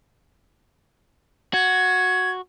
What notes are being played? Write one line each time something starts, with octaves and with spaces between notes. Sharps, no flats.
F#4 G#6